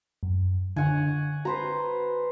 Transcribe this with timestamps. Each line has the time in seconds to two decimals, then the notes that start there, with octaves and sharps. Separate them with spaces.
0.23 F#2
0.76 D3 C#5 F#5 G#5
1.45 F#4 B4 C5 A#5